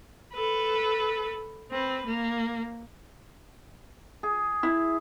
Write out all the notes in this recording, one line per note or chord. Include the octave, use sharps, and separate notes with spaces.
A4 B4
C4 B4
A#3
G#4
E4